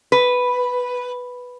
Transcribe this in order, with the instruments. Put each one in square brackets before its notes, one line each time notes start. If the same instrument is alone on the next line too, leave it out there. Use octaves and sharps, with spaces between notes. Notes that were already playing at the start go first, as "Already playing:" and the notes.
[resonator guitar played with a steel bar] B4